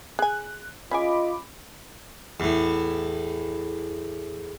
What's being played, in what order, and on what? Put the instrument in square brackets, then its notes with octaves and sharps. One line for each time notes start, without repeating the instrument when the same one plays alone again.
[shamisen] G#4 G#5 [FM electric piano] F#6
[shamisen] C#4 G#4 G#5 [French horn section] F4 D#5 [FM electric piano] B5 D6
[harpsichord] E2 A2